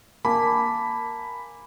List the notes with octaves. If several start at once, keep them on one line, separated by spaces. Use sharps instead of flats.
A#3 G#5 A5 B5 D6